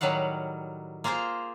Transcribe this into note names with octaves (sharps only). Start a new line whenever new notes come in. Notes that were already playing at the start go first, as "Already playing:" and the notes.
A2 D#3 F#3 G3 F5 F#5
A#3 F4 G#4 A#4 C5